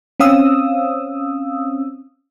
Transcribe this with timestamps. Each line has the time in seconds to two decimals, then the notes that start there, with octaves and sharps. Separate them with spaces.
0.20 C4 C#4 F5 D#6 E6